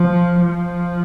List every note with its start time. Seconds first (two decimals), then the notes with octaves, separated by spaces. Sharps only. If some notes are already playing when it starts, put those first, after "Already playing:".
Already playing: F3
0.40 F3